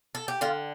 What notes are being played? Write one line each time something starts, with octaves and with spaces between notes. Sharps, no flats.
A4
G4
D3 F4